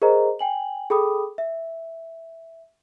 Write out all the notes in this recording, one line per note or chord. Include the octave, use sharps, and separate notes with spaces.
G#4 A#4 C5 D#5 A#5
G5 G#5 F#7
G#4 A4 G5 B5 D6 D#6
E5